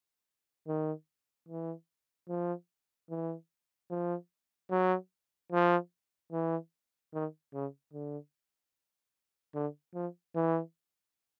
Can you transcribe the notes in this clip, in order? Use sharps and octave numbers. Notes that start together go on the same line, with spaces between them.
D#3
E3
F3
E3
F3
F#3
F3
E3
D#3
C#3
D3
D3
F3
E3